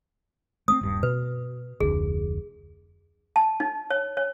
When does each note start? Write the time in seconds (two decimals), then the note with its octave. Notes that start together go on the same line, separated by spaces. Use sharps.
0.68 A3 B3 C4 D#6
0.81 D#1 G2
1.03 B2 B4
1.80 F1 D2 G#4
3.36 A5
3.60 D#4
3.90 C#5
4.17 C#5